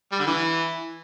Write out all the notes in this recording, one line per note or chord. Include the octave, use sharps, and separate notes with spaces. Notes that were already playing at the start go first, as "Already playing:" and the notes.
G3
D3
E3